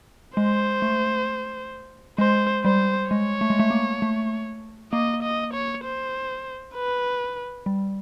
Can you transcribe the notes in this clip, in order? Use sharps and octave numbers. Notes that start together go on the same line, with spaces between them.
G#3 C5
A3
G#3 C5
G3 C5
G#3 C#5
A3
G#3
A3
A#3
A3
A#3 D#5
D#5
C#5
C5
B4
G3